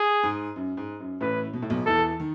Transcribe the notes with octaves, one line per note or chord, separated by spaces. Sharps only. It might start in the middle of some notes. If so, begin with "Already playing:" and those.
Already playing: G#4
G#2
F#2
G#2
F#2
A1 A2 B4
B2
A2
B1 B2
E2 E3 A4
D#3